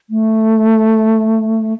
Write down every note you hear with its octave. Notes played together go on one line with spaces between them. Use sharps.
A3